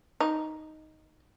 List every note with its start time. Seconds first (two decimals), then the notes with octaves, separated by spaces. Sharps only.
0.20 D#4